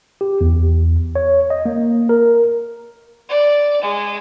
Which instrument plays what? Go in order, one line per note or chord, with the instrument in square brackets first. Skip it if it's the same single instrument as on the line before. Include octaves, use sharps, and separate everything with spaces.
[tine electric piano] G4
E2
C#5
D#5
A#3
A#4
[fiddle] D5
G#3